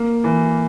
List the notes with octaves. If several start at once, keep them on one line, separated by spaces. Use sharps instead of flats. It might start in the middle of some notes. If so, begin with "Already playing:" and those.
Already playing: A#3
E3